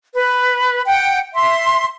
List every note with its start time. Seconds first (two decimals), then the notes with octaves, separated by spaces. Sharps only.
0.15 B4
0.86 F#5 G5
1.34 E5 C6